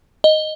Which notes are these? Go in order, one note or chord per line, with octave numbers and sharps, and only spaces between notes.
D#5